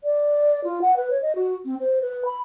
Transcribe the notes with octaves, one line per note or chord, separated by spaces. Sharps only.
D5
F4
F#5
B4
C#5
D#5
F#4
C4
C5
B4
B5